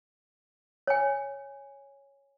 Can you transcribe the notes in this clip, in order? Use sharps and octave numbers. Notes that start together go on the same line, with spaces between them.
C#5 G#5